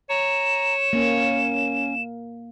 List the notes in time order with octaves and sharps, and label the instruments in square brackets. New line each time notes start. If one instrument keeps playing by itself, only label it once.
[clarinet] C#5 [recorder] A#5 [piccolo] E7
[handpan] A#3 [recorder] C#4